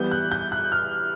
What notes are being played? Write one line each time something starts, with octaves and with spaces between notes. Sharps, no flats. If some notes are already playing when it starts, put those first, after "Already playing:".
Already playing: E3 G3 B3 G6
F#6
G6
F#6
F6